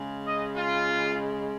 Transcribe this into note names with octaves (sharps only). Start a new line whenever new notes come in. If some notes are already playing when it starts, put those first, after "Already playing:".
Already playing: C#3 G#3
D#5
F4